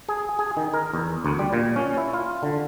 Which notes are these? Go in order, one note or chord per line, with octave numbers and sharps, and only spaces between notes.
G#4
G#4
D#3
A#4
E2
D2
G3
A#2
C#4
E4
F4
D3